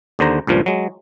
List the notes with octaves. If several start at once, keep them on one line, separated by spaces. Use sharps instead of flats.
D#2 D3 C5 A#5
C#2 G2 A#2 F3
F#3 G#3